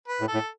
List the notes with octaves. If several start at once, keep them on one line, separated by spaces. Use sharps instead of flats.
B4
A2
A4
A2